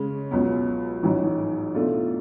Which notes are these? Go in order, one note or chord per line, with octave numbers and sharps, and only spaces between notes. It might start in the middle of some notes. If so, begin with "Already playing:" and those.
Already playing: C#3 G#3 C#4
C#2 B2 F#3
A1 G#2 F#3
B2 A3 D4 F4